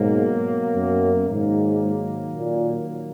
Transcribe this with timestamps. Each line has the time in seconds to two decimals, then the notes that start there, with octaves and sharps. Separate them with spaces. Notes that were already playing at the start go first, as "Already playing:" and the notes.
Already playing: G#2 B2 F#3 A#3
0.75 F#2
1.28 G#2 D#3 F#3 A#3
2.33 A#2